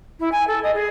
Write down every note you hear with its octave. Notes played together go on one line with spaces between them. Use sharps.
E4
G#5
A4
D#5
G#4